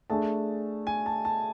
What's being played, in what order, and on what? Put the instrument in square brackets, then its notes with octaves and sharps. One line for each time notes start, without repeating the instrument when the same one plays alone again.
[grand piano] A3 D4 G#4 [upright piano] A5
[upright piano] G#5
A5
A5